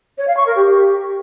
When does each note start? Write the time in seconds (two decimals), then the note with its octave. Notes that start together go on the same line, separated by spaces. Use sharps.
0.18 C#5
0.27 F5
0.37 C#6
0.46 A#4
0.56 G4